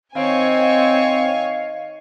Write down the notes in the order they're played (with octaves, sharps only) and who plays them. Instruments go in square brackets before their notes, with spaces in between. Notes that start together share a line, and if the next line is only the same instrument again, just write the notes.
[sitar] D#3 [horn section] C4 [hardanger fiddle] C#5 G#5 [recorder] F5